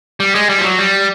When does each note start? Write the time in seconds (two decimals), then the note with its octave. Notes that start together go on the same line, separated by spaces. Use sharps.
0.20 G3
0.35 G#3
0.49 G3
0.59 F3
0.64 F#3
0.79 G3